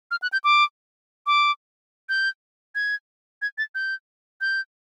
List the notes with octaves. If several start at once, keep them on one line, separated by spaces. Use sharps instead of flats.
F6
F#6
G6
D6
D6
G6
G#6
G#6
A6
G6
G6